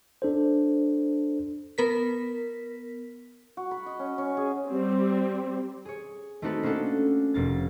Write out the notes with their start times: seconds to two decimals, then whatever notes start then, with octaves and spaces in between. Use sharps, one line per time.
0.22 D4 A4 C5
1.78 B3 A#4 B6
3.57 F#4
3.71 B5
3.86 D#5
3.99 C#4
4.18 C#4
4.37 G#4
4.69 G3 C4
5.85 G#4 C#5
6.42 A3 C4 D#4 F#4 A4 B4
6.63 A#3 C#4 D4 A4 F#5
7.34 F1 A#3 A6